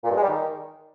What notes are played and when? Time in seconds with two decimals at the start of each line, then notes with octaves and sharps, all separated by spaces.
0.04 A#2
0.10 G2
0.16 G#3
0.22 G3
0.28 D#3